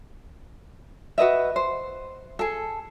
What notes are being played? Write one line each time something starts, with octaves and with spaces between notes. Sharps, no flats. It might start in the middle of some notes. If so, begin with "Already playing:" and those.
F#4 B4 D#5 E5
C5
G#4 A4